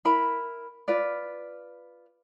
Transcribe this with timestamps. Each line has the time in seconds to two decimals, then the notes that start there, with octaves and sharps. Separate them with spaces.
0.05 E4 A#4 B5
0.88 F4 B4 D5